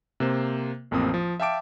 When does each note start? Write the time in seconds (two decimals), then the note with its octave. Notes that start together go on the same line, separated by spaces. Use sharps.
0.20 C3 A#3 C5
0.91 A1 F2 A#3 C4 D#6
1.14 F3
1.40 E5 F5 G5 A5 D6 D7